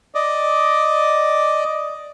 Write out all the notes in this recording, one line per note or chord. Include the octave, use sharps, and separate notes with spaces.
D5 D#5